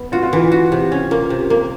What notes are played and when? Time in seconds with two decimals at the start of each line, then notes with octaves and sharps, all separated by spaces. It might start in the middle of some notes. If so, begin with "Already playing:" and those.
Already playing: B3
0.12 F4 F#4
0.23 F4
0.33 E3
0.52 F#4
0.72 C3
0.92 C#4
1.11 A#3 F4
1.30 C3
1.50 A#3